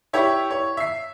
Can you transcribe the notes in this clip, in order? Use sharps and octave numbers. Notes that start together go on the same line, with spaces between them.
E4 G4 C#5 E5
C#5
E5 C7